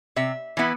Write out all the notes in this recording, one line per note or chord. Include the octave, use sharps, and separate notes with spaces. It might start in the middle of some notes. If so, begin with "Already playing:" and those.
C3 E5
E3 B3 E4